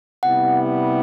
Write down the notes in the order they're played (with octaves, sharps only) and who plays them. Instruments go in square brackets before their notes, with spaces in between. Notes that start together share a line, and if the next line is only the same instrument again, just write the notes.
[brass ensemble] C3 G3 B3 E4 [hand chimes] F#5